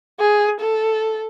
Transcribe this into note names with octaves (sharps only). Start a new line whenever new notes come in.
G#4
A4